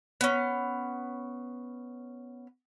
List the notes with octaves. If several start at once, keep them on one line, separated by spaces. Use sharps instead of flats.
B3 C#4